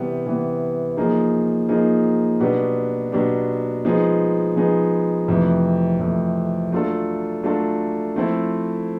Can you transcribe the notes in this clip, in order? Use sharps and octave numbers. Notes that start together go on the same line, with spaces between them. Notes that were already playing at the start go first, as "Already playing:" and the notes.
Already playing: C3 E3 G3 B3
C3 E3 G3 B3
F3 A#3 D#4 G#4
F3 A#3 D#4 G#4
B2 F#3 B3 D4 G4
B2 F#3 B3 D4 G4
F3 G#3 B3 D#4 G#4
F3 G#3 B3 D#4 G#4
F2 C3 E3 A3
F2 C3 E3 A3
F#3 A3 D4 F4 A4
F#3 A3 D4 F4 A4
F3 A3 C4 E4 A4